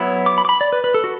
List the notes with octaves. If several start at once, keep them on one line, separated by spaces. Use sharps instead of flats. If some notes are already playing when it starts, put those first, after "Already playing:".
Already playing: F#3 B3 E4
D6
B5
D6
B5
D5
B4
B4
A4
F#4